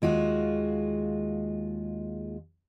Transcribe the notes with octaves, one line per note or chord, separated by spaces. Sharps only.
D#2 G#3 F4 F#4